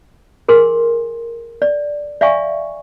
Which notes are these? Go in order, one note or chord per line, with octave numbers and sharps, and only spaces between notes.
G#4 A#4 G#5 C6
D5
D5 E5 F5 G#5 C#6